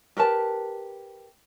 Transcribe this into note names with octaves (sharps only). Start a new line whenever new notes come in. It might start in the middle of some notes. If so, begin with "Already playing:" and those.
G4 A#4 B4 A5